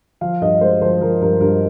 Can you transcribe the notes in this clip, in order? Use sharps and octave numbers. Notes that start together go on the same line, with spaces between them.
F3 F5
G2 D#5
G#3 C5
F3 C5
F3 A#4
G2 A#4
G2 A#4